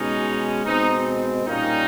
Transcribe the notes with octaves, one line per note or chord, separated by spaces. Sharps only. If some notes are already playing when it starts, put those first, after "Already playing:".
Already playing: B2 G#3 C#4 D#4
B2 G#3 C4 D#4
A#2 G3 A#3 C#4 D#4